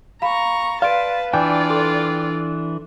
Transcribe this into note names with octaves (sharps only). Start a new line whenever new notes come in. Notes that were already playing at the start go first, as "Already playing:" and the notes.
F5 A#5 B5 C#6
B4 D5 F5 A5 C6 D7
E3 D4 F4 D5 G5 G#5
A4 C6